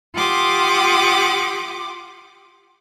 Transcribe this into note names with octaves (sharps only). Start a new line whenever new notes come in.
F4 G4 F#5 C6 D6 D#6